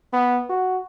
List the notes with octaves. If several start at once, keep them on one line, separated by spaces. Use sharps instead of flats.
B3
F#4